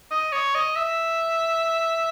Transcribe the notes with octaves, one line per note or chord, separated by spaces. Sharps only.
D#5
C#5
D#5
E5